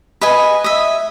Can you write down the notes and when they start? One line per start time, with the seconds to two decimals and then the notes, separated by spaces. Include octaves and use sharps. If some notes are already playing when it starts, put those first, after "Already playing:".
0.21 B4 D#5 G#5
0.64 D#5 E5